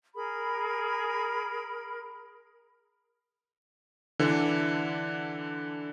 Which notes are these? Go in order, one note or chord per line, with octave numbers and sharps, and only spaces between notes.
G#4 A#4 B5
D3 E3 D4